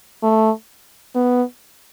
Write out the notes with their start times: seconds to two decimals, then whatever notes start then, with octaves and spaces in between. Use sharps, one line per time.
0.23 A3
1.15 B3